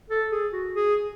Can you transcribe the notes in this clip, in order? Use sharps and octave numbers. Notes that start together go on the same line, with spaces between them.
A4
G#4
F#4
G#4